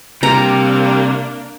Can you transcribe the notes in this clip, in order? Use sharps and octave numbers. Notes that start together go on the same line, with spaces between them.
C3 G3 A#3 D4 A#5